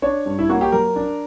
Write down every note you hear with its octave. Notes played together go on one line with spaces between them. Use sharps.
D4 C#5
G2
E4
A#3 F#4
G4
F#3 A#4
D4